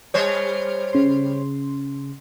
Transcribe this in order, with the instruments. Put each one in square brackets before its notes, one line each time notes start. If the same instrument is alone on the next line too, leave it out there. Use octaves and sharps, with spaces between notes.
[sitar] G3 C5 C#5
[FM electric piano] C#3 C6